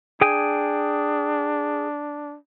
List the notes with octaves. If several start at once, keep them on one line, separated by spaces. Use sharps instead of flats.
D4 G#4 G5 G#5